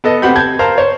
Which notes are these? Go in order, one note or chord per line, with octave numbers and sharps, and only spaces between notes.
B3 A4 D#5
B3 C4 G4 F#5 B5 G6
A5 G6 G#6
A#4 C5 F5 A5 A#5
C5 C#5